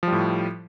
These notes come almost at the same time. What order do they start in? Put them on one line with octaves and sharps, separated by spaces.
F3 G3 A2